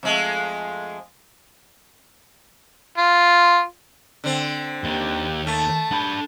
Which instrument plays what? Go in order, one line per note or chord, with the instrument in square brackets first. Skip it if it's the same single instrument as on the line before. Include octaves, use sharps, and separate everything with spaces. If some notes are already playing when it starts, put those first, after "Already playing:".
[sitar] F2 G#3 A3
[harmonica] F4
[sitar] D3 C4
[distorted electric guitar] D#2 [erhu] G4
[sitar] A3 [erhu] A5
[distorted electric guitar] D4 B5